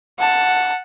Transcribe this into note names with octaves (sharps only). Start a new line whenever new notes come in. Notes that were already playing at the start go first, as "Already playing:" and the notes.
F#5 A5